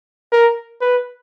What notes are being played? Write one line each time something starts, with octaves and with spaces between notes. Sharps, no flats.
A#4
B4